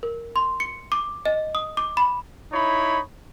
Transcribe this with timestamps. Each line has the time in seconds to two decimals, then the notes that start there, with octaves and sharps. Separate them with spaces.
0.03 A#4
0.36 C6
0.60 C#7
0.92 D6
1.25 D#5
1.55 D#6
1.77 D6
1.97 B5
2.52 D#4 E4 C#5 B5